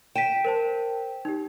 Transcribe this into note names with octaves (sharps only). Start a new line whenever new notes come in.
G5 B6 D#7 E7
A#4 C5 A5
D#4 G4